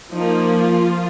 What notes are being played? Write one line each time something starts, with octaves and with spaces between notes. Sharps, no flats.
F3 A#3 D#4
F4